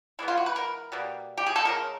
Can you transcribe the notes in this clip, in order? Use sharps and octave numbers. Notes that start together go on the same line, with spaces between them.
E3 G#3 B3 E4
F4
F#4
B4
A#4
B2 G3 A#3
G4
G#4
A4
C#3 F3 G#3 A#4